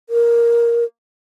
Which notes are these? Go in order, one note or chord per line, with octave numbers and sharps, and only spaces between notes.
A#4